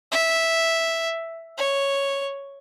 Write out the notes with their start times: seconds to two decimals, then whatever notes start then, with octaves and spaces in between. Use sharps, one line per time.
0.12 E5
1.58 C#5